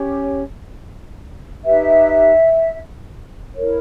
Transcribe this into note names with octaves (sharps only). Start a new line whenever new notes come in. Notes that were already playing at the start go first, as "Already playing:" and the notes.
Already playing: C#4 G4 C#5
D#4 G4 B4 E5
E4 A#4 C#5